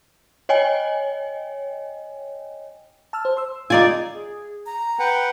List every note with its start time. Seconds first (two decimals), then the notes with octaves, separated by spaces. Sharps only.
0.49 C#5 D#5 G5 G#5
3.13 A5 E6 F6
3.25 C5
3.37 C6 E6
3.70 D#4 F4 D5 G#5
4.14 G#4
4.66 A#5
4.99 B4 F#5 G5